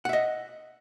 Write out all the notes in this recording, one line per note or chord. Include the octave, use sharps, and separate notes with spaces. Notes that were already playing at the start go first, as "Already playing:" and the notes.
D#5 E5 F#5